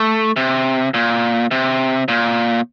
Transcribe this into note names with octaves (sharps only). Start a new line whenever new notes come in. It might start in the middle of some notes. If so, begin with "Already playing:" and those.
Already playing: A3
C3
A#2
C3
A#2